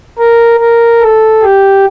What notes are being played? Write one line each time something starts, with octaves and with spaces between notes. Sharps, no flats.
A#4
A#4
A4
G4